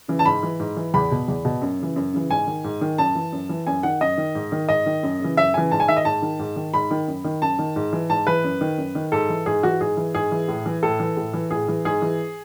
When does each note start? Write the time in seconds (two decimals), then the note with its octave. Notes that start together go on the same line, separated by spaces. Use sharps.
0.08 C#3 E3
0.19 A5
0.25 G#2 B5
0.43 E3
0.60 G#2
0.77 E3
0.94 E2 B5
1.11 B2
1.28 E2
1.45 B2
1.62 F#2
1.79 C#3 E3
1.96 F#2
2.13 C#3 E3
2.30 G#2 G#5
2.47 D#3
2.64 G#2
2.81 D#3
2.98 F#2 A5
3.15 E3
3.32 F#2
3.49 E3
3.67 F#2 G#5
3.83 D#3 F#5
4.01 F#2 D#5
4.18 D#3
4.35 G#2
4.52 D#3
4.69 G#2 D#5
4.86 D#3
5.03 F#2
5.20 C#3 E3
5.37 F#2 E5
5.54 C#3 E3 G#5
5.71 G#2 A5
5.80 G#5
5.88 D#3 E5
5.97 D#5
6.05 G#2 A5
6.22 D#3
6.39 G#2
6.56 D#3
6.73 G#2 B5
6.91 D#3
7.08 F#2
7.24 D#3
7.42 F#2 A5
7.59 D#3
7.76 G#2
7.93 E3
8.09 G#2 A5
8.27 E3 B4
8.44 F#2
8.61 D#3
8.78 F#2
8.95 D#3
9.12 G#2 A4
9.29 E3
9.46 G#2 G#4
9.63 E3 F#4
9.80 G#2 G#4
9.97 E3
10.15 G#2 G#4
10.32 E3
10.48 A2
10.66 E3
10.83 A2 A4
11.00 E3
11.17 A2
11.33 E3
11.51 A2 G#4
11.68 E3
11.85 G#2 G#4
12.02 E3